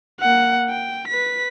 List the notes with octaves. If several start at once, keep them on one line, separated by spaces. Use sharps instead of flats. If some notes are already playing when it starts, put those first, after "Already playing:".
A#3 F#5
G5
B4 B6